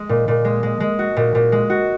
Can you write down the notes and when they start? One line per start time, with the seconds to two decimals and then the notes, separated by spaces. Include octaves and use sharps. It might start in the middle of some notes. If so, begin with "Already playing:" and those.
Already playing: G#3
0.09 A#2
0.28 A#2
0.45 G#3
0.63 G#3
0.80 G#3
0.99 F#4
1.16 A#2
1.35 A#2
1.52 G#3
1.70 F#4